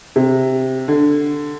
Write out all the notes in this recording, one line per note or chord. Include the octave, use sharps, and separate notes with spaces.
C3
D3